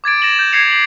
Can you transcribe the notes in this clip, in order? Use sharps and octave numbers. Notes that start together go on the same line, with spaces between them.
D6 G#6 A6 D7
A6 A#6 E7 F#7
G6
G#6 A#6 C7 C#7 F7
B6 F#7